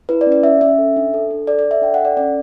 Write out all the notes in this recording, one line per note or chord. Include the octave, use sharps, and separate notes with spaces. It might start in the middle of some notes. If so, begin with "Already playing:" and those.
E4 B4
D5
C#4
D5
C#4 E5
C#4 E5
A4
D4
A4
D4
A4 D5
D5
A4
E5
D4 G5
F#5
A4
D5
C#4 D5